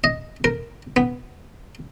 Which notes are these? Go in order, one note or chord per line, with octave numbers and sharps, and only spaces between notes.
D#5
A#4
B3